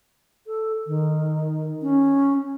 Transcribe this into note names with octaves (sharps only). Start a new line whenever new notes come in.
A4
D#3
C#4